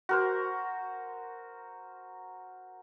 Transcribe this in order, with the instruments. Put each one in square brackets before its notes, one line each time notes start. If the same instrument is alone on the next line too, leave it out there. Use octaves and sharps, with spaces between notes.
[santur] F#4 A#4 C5